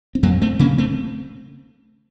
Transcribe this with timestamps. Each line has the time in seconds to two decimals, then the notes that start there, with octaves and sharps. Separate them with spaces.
0.15 C4
0.23 F2 F#3 A#3
0.42 A3 C4
0.59 C#3 A#3 C#4
0.78 A3 C4